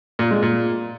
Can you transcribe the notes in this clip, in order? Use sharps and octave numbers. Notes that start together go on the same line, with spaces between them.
A#2
G#3
A#2